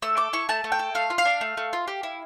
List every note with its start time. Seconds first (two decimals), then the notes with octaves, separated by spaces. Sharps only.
0.02 A3 E6
0.17 A4 D6
0.33 E4 C#6
0.49 A3 A5
0.64 A3
0.72 G5
0.79 A4
0.95 A3 F5
1.10 F4
1.18 F5
1.25 D4
1.41 A3
1.57 A3
1.73 F4
1.88 G4
2.03 E4